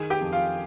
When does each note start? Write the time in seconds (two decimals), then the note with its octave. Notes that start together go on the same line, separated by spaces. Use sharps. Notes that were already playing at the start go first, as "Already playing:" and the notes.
Already playing: D#3 G#4 G#5
0.10 G4 G5
0.21 F2
0.33 F4 F5